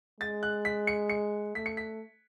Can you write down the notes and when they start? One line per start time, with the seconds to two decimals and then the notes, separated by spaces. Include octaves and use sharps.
0.21 G#3 A6
0.43 F#6
0.65 B6
0.87 C#7
1.09 C#7
1.55 A3 B6
1.66 C#7
1.77 B6